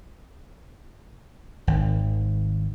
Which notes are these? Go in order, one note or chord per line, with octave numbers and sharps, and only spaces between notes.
G#1 D#3